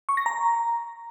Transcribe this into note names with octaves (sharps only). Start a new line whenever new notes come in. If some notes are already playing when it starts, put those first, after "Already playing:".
C#6
A#6
A#5